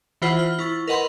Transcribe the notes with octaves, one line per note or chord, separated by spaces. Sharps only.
E3 E4 F4 C5 F#5 F6
F6
E4 C#6 A6
A#4 B4 D#5 F#5 B5 C6